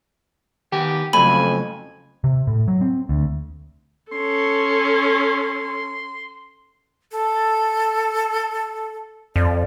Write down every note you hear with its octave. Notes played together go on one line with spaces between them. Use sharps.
D#3 B3 G4 G#5
F2 C#3 F#3 A3 G#5 B5
C3
A2
F#3
C4
D2
C#4 A4 C6
A4
F2 D5